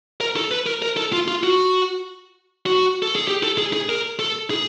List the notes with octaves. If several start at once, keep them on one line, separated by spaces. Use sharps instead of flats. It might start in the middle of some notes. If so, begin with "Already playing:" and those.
A#4
A4
B4
A#4
A#4
A4
F4
F4
F#4
F#4
A4
G#4
G4
A4
G#4
G#4
A#4
A4
G#4